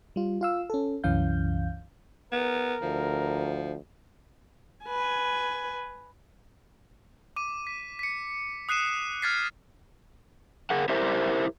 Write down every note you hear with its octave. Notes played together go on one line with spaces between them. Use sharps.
G3 F4
F4 F5 E6
C#4 A4
C2 F#2 E3 C#4 F5 G6
B3 A#4
D2 F3
B4 G#5
D6 D#7
B6
B6 C#7
D#6 F#6 C7 D#7 E7
F6 F#6 G#6 A6 B6 C7
G#4 A#4 F#5
E4 G4 A#4 C5 E5